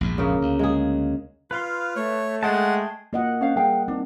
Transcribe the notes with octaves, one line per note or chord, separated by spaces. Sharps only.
A#1 E2 G#2
C#3 A#3
D2
G#3 G#4
F4 B4 F5 C6
A3 C#5
G#3 G#4 F#5 G5 A5
A#3 F4 D#5 F#5
C#4 C5 F5
G3 G#4 A#4 F5 G5
C4 D4 D#4